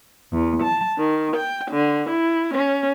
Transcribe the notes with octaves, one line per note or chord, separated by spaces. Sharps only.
E2
A5
D#3
G5
D3
E4
C#4